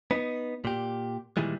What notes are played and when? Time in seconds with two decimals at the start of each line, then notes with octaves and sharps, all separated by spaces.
0.11 B3 D#4
0.65 A#2 G4
1.37 A#2 D#3 E3 G3 G#3